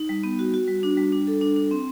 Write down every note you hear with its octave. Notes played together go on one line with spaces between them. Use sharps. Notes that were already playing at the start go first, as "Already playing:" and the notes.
Already playing: D#4
G3
B3
F#4
F#4
G3
D4
G3
D4
A4
D4
D4
C4